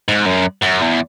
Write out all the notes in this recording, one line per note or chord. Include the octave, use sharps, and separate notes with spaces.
G#2
F#2
F#2
E2